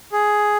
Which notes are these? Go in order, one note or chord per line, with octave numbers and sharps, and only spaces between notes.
G#4